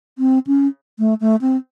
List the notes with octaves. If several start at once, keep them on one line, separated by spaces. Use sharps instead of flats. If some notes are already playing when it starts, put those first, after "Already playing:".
C4
C#4
A3
A3
C4